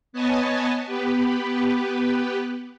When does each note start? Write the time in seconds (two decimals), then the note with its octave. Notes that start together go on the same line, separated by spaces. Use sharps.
0.13 B3 B4 C#5 D#5 G#5 A5
0.86 B3 G4 B4